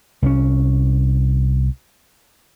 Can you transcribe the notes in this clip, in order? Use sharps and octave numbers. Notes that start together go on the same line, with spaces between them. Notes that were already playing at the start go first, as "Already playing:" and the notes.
C2 F#3 C#4